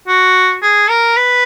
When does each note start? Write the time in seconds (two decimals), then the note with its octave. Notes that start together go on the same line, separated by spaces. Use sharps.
0.07 F#4
0.62 G#4
0.89 A#4
1.16 B4